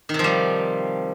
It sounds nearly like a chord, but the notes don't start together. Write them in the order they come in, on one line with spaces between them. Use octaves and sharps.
D#3 C3 F3 G3